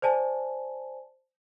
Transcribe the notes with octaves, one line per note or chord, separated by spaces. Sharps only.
C5 D5 G#5 A5